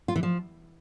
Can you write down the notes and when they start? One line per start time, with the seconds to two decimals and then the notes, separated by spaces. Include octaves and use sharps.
0.08 F4
0.16 E3
0.23 F3